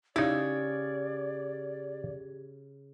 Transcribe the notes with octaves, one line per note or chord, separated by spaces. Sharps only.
C#3 D#4 E4 G4 D5 G#6